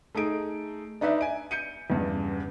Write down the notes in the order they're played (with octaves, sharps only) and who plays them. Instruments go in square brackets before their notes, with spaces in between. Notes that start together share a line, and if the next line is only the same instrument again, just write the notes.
[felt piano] A3 D#4 G#4 D7
D4 D#4 B4 D5 E5
G#5 D7
G6 C#7 D#7
E2 G2 C#3